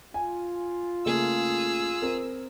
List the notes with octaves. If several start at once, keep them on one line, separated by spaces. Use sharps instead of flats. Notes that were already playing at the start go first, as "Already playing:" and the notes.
F4 G#5
C#3 A3 A#3 G#4 E6
C4 A#4